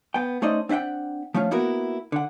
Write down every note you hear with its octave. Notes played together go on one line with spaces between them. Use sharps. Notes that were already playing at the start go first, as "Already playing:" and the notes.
B3 G5
A3 C#4 D#4 C5 D5 D#5
C4 D4 E5 F#5 G5
F3 A3 C#4 F4
A#3 B3 E4 F#4 A#4
D3 F#5